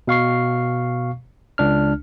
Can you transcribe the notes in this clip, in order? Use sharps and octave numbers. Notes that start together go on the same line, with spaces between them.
B2 F5 C#6 C7
C#2 D4 F6